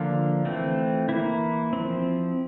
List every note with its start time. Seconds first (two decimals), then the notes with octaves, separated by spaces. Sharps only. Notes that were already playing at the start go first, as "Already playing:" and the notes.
Already playing: D3 F3 A#3 F4
0.45 E3 A3 C4
1.09 E3 A#3 E4
1.73 F3 C4